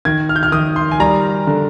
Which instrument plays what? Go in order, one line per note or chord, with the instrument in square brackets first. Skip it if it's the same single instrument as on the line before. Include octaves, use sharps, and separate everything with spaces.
[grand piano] D#3 G#6
F6
G6
F6
D#3 D#6
C6
G#5
G3 A#5
D3